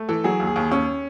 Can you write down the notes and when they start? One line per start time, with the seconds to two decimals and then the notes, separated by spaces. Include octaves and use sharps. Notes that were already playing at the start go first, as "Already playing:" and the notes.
Already playing: A3
0.09 E3 A4
0.24 F#3 G#4
0.40 D#2
0.47 G#4
0.56 D#2
0.71 D#2 C#4